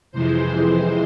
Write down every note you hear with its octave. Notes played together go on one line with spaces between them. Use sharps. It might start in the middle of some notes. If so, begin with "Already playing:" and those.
F2 C3 E3 G#3 C5